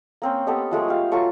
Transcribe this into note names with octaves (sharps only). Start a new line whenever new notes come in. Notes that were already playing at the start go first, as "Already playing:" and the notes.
A#3 C4 C#4
B3 G4 A4 D#5
F3 G#3 A3
G4 F5
F#3 F4 A4 C#6